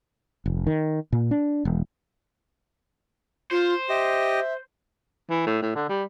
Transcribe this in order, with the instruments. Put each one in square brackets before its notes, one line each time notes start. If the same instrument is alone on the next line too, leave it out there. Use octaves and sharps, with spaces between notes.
[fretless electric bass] F1
D#3
A#2
D4
E1
[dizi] F4 [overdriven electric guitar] C5
[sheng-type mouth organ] G4 D#5 [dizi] E5
[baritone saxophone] E3
A2
A2
D3
G3